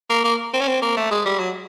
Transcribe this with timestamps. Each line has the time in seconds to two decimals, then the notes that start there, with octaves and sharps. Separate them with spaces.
0.10 A#3
0.24 A#3
0.54 C4
0.61 C#4
0.68 C4
0.82 A#3
0.97 A3
1.11 G#3
1.26 G3
1.39 F#3